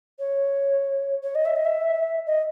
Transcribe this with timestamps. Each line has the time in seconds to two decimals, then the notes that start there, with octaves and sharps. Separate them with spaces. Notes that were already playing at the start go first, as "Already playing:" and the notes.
0.19 C#5
1.23 C#5
1.35 D#5
1.45 E5
1.55 D#5
1.65 E5
2.26 D#5